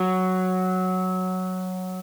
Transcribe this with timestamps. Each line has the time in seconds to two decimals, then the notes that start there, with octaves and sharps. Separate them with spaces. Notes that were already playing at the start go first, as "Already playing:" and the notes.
Already playing: F#3